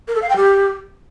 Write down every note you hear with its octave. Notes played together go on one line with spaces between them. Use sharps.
A#4
A4
F5
G5
G4